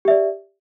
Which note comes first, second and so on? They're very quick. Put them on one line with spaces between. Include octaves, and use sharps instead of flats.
G4 E5 D5